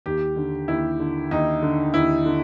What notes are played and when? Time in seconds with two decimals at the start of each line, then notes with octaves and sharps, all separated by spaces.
0.06 D#2 G4
0.36 D3
0.68 D#2 E4
1.00 D3
1.31 D#2 D#4
1.62 D3
1.94 D#2 E4
2.26 D3